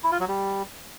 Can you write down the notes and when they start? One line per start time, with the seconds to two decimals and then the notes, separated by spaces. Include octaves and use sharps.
0.04 E4
0.12 F4
0.20 F#3
0.28 G3